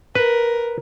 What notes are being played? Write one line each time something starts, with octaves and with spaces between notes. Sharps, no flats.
A#4 B4